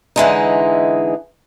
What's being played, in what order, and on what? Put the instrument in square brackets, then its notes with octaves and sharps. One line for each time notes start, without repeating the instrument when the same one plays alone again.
[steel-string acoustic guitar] D3 E3 G#3 D#4